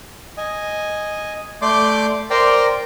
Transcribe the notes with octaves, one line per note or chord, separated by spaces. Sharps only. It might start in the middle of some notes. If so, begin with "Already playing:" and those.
D#5 G#5
A3 D5 C6 D6 G6
A#4 C5 D5 G5 A#5 C6